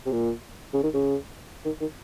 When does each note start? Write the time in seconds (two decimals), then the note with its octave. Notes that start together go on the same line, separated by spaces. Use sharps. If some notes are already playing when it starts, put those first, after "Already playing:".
0.06 C3
0.12 A#2
0.74 C#3
0.84 D#3
0.94 C#3
1.66 D#3
1.81 D#3